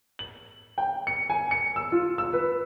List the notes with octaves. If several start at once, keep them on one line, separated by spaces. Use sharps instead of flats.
F#7
G5
C#7
G#5
C#7
E6
F4
E6
B4